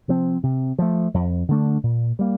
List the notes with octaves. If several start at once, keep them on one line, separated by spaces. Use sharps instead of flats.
C3 F3 C4
C3
F3 A3
F2
D3 A3 D4
A#2
G3 A#3